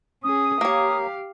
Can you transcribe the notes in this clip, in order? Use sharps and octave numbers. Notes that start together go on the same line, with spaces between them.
C#4 G#4 D#6
A#3 G4 C#5 F5